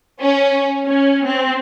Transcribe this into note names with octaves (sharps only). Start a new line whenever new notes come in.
C#4
C#4
C4